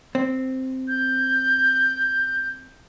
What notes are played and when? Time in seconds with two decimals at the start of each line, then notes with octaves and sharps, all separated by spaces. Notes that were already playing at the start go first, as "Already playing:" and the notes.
0.15 C4
0.88 G6